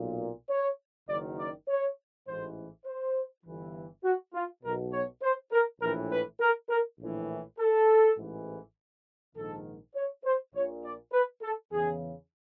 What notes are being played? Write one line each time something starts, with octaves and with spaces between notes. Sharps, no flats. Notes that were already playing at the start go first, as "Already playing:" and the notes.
Already playing: B1 A#2
C#5
F#1 F#2 D#3 D5
D5
C#5
A1 G#2 E3 C5
C5
G1 G2 E3
F#4
F4
B1 B2 A#4
C#5
C5
A#4
A#1 A2 E3 A#4
B4
A#4
A#4
A#1 A2 E3
A4
A1 G#2 E3
A#1 G#2 D#3 A4
C#5
C5
A#1 A#2 C#5
D5
B4
A4
E2 C#3 E3 G#4